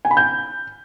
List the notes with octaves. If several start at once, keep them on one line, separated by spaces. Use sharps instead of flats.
G#5
B5
G6